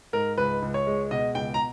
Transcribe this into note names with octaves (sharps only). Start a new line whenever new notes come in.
G#2 A#4
C#2 B4
C#2
C#5
G#3
B2 D#5
C#2 G5
A#5